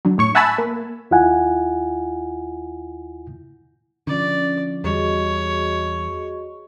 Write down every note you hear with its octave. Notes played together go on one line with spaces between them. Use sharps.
D3 F#3
A2 C#5 C#6
E5 F#5 G#5 A5 B5 E6
A#3
D#2 E4 F4 F#5 G#5
D3 F3 C#4 D5
E2 G3 F#4 G#4 C#5 D#5